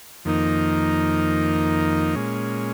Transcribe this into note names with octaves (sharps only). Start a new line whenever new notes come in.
F2 D#3 A#3 D#4
A#2 G#3 C#4